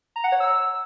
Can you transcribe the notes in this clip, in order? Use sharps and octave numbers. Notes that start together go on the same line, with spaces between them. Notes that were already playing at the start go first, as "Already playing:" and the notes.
A#5
F#5
C#5
E6